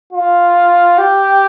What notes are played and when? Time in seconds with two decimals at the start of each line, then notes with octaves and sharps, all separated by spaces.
0.13 F4
0.98 G4